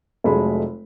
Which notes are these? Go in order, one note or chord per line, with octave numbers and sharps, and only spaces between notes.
F1 F#3 G#3 A3 B5